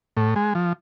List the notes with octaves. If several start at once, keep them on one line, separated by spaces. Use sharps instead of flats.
A2
G#3
F3